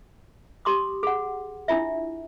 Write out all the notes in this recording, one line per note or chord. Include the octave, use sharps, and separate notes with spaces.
G4 C6 D6 D#6
G#4 F#5
D4 E4 F4 E5